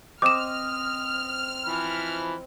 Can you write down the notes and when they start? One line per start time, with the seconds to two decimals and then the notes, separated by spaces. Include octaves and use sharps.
0.22 C4 D#5 D6 F6 E7
1.65 E3 F3 B5